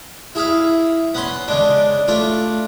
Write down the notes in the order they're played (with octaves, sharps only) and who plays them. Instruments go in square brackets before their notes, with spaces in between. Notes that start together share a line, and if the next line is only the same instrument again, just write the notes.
[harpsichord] E4 G#4 E5 F5
B3 C#4 C6
C#3 G#3 D4
A3 D4 F4